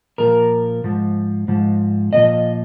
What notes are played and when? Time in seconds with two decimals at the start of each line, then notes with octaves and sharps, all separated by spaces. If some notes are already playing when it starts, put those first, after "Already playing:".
0.18 A#2 F3 A#4
0.84 G#2 F3
1.48 G#2 F3
2.13 A#2 F3 D#5